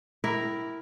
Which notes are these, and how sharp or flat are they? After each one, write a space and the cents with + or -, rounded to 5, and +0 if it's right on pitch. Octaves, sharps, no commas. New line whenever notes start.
E4 +0 G4 -25 A#4 +0